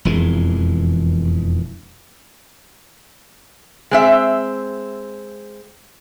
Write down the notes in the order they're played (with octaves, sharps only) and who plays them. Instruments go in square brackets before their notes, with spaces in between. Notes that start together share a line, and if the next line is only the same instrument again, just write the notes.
[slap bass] E1 F2 E3 G#3
[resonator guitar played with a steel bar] G#3 C4 E5